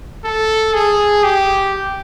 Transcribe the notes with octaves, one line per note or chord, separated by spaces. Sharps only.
A4
G#4
G4